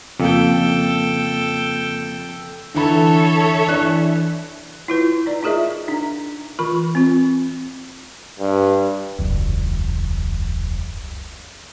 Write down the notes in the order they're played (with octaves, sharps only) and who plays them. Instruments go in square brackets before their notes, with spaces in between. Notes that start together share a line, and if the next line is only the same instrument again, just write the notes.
[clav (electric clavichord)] F2 [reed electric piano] C#3 A#3 [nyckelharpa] A4 G5
[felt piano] D3 E3 B5 [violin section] A4 C#5 E5
[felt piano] E3 D4 F#6
[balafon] E4 F4 B4
D#4 D5
D#4 F4 G#4 A#4 D#5 E5
D4 D#4
E3 F4 A#4 B5 C#6
C4 F4
[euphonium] G2
[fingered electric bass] E1 C#2 F#2